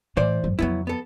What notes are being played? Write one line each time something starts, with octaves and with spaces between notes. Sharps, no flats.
A2 E3 C5 D5
G#1 F#2
F2 C#3 F#3 B3 E4
B3 A4